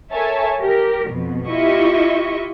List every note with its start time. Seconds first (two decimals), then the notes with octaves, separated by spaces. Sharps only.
0.12 A4 A#4 C#5 E5 G#5 A5
0.60 G4 A#4
1.10 F2 B2
1.48 E4 F4 G4 D#5 E5 C#6